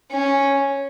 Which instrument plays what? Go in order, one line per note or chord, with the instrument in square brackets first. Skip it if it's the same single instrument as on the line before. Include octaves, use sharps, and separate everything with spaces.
[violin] C#4